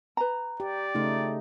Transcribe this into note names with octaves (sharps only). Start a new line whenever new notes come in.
B4 A#5
G4 D5
C#3 A3 D#4 F4